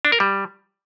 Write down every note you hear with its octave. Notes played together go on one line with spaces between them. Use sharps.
D4
A#4
G3